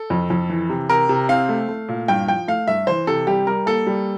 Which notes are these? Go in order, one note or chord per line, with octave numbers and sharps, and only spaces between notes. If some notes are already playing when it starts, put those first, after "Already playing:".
Already playing: A4
F2
F2
E3
C3
C3 A#4
C3
C4 F5
A3
A3
A#2
G2 G5
F3 G5
A3 F5
G2 E5
E3 C5
C3 A4
G3 G4
G3 A#4
A#3 A4
G3